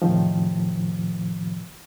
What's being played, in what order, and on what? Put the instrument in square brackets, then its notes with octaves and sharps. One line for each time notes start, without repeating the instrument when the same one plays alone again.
[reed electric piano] E2 A2 C3 D#3 F3